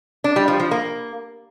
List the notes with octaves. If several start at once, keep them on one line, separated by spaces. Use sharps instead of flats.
D4
G3
F3
F3
A#3